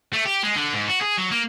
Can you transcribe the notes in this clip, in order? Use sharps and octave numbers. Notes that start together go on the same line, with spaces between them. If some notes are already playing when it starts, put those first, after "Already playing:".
A3
G4
G#3
D3
G#2
F#4
G#4
F#3
A#3